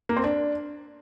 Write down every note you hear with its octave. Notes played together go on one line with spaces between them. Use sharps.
A#3
C4
D4